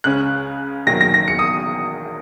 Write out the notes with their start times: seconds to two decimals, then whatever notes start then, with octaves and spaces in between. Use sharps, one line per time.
0.04 C#2 C#3 G#3 C#4 F#6
0.87 E1 E2 D#3 F#3 A#3 A#6
1.01 A#6
1.14 A#6
1.28 C#7
1.39 D#6